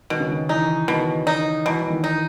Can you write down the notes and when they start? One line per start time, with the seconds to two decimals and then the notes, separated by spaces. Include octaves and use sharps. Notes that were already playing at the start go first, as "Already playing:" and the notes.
0.10 B2 D#3
0.20 C#3
0.28 D#3
0.49 E3 D#4
0.88 B2 D#3
1.27 D#4
1.66 B2 E3
1.82 E3
1.90 D#3
2.04 D#4